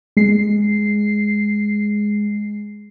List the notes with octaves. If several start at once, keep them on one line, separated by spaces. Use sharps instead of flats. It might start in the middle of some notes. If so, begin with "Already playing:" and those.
G#3 C7